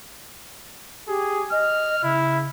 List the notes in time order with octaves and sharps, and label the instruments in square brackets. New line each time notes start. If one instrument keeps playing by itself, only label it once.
[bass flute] G4 [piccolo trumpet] G#4
[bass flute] D#5 [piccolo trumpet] F6
[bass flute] C#3 [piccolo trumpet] E4